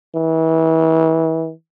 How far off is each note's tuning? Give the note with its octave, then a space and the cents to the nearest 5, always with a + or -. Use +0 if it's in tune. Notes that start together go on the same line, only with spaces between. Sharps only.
E3 -30